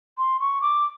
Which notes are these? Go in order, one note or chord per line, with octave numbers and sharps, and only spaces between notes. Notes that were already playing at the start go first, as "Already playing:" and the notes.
C6
C#6
D6